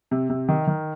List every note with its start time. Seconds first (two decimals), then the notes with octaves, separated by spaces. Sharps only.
0.11 C3
0.30 C3
0.48 D#3
0.67 D#3